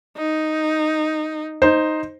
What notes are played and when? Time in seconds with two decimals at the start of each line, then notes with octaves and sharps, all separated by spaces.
0.17 D#4
1.62 D#4 C5